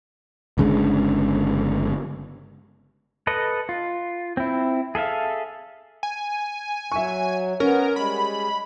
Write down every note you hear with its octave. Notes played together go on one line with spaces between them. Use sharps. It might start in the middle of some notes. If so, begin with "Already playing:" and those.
G1 C#3 G#3 D4
A4 B4 D#5
F4
C4 E4
G#4 A4 E5 F5
G#5
F#3 E5 C#6
B3 C#4 A#4
G3 G#3 B5